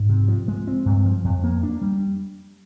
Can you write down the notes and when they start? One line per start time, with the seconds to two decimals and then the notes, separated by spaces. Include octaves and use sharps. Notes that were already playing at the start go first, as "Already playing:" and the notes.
Already playing: G#2
0.09 C3
0.28 F3
0.48 G#3
0.67 C4
0.86 G2
1.05 F3
1.24 F2
1.44 A#3
1.63 D4
1.82 G3